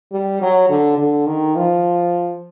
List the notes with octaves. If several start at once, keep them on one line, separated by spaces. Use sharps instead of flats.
G3
F#3
D3
D3
D#3
F3